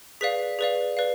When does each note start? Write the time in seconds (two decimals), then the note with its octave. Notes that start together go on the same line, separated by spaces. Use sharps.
0.21 G#4 B4 D5 F5 B6
0.59 G#4 B4 D5 F5
0.97 B4 D5 F5